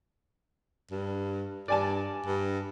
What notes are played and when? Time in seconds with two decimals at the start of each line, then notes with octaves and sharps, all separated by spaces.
0.91 G2
1.68 G2 D5 G#5 A5
2.26 G2